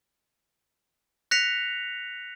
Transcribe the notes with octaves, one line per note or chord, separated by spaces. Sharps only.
F#6 A#6 B6 C#7 F7